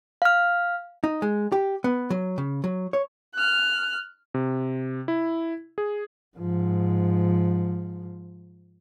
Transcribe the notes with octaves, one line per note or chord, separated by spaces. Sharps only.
F5 F6
D#4
G#3
G4
B3
F#3
C#3
F#3
C#5
F6 F#6
C3
E4
G#4
G#2 F3